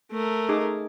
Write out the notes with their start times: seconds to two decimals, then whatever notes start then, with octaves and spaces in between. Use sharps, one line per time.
0.11 A3 A#4
0.49 D#4 G#4 D6